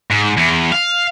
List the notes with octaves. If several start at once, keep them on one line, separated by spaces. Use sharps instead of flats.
G#2
E2
F5